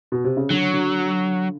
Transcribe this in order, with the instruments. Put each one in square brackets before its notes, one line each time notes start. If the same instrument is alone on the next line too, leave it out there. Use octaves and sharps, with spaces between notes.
[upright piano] B2
C3
C#3
[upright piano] D3 [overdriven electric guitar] F#3
[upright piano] D3